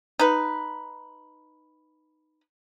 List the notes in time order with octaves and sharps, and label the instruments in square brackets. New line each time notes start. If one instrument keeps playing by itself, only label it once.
[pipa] D#4 B4